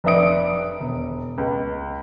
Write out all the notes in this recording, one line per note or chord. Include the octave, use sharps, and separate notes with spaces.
F1 C4 D4 E5 D#6 D7
E1
C#2